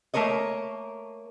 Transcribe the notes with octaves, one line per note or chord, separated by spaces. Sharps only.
A3 A#3 A#4 C#5 D#5